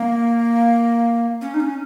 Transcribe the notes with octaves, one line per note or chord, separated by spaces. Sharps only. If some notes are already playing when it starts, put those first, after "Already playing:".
Already playing: A#3
C#4
D#4
C#4